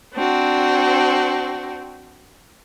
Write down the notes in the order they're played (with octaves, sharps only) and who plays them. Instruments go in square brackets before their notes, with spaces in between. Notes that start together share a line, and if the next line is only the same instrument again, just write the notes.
[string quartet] C4 D4 F#4